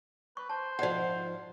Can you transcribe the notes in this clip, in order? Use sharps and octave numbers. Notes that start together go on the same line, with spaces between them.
B4 C#6
C5 A5
G#2 F3 D5 F#5